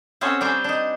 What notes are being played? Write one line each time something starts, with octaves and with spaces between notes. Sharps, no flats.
C4 C#4 F#4 G#4 A4 C#5
G3 D4 C5 G5 G#5 A#5
D4 D#4